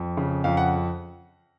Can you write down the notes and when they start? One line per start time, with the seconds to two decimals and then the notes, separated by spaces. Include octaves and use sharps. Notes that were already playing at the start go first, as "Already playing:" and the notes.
Already playing: F2
0.17 C#3
0.44 F2 F5
0.57 F#5